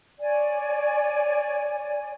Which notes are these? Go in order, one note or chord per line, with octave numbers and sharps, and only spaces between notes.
C#5 D5 G#5